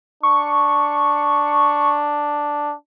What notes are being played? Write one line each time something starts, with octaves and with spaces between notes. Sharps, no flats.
D4 C#6